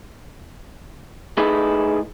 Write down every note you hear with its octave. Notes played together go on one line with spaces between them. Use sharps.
A3 D#4 E4 G#4 B4